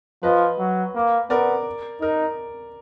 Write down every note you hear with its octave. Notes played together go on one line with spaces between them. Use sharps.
F3 B4 D#5
F#3
A#3
B3 A#4 D5
D#4 A#4